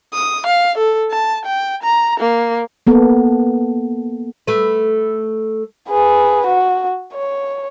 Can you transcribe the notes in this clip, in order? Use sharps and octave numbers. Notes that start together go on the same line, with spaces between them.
D#6
F5
A4
A5
G5
A#5
A#3
A#3 B3 A4
A3 B4
G#4 B4
F#4
C#5